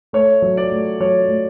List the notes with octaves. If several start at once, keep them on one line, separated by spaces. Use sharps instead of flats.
A3 C#5
F#3
D5
A3
F#3 C#5
A3